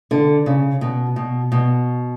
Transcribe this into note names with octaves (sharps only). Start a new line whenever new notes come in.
D3
C#3
B2
B2
B2